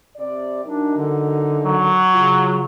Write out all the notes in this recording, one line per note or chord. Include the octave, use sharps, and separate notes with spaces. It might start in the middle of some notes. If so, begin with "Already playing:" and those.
C3 D5
F#2 D4 D#4
D3
F#3
C#3 F4